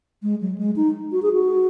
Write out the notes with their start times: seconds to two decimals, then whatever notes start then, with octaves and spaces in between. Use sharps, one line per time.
0.23 G#3
0.41 F#3
0.58 G#3
0.76 D#4
1.12 F#4
1.23 G#4
1.33 F#4